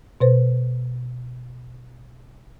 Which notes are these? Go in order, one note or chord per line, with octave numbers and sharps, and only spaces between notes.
B2 B4 C5